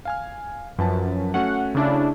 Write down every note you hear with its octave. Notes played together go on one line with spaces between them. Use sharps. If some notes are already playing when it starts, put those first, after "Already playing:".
F5 G#5 F6
F#2 F3 B4 A5
A3 C#4 F#4 F#5
C#3 D4 E4